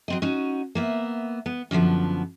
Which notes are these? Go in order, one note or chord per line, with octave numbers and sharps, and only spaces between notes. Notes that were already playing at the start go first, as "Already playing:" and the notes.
F#3 C4 D#5
C#4 D#4 F#4
A#3 B3 E5
B3
F#2 D3 E3 F3 B3